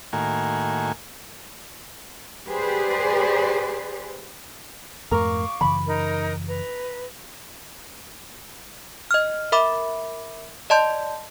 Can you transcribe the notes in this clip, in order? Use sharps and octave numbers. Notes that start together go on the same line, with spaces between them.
A2 D#3 A#3 F#4 G#5
G4 G#4 B4 C5 D5
F2 G#2 A3 A#4 F5 C#6 D6
F#2 C#3 E3 B5
D#4 A#4
B4 A#5
D#5 F6
A#4 E5 B5 D6
D5 D#5 A5 C6 G6